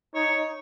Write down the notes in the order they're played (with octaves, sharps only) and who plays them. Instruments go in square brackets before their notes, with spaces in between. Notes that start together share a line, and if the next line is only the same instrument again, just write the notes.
[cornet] D#4 [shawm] C#5